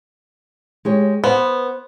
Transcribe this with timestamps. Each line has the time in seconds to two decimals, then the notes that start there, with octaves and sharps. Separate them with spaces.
0.85 G#3 G4 C#5
1.24 B3 C5